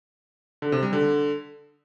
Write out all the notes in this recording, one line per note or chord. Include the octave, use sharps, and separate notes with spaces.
D3
C3
G3
D3